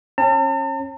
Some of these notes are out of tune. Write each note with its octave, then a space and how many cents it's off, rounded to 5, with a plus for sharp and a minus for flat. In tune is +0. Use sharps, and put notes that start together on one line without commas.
C#4 -30 A5 +45